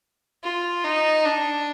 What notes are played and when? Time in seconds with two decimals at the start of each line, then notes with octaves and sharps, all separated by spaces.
0.43 F4
0.84 D#4
1.25 D4